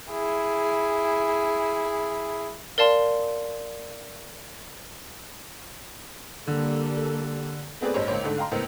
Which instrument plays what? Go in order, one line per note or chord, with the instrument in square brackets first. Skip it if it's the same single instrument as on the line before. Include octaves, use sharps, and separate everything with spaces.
[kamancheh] E4 G#4
[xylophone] A#4 D5 F5 A5 C6
[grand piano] D3 [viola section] G3 A#3 A4
[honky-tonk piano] A3 B3 C4 G#4 B4 D5
A1 G2 C5 C#5
C#2 A#3 C5 C#5
G#2 D3 A3
F5 G5 A#5 C6
C#2 A2 B3 A#4 C5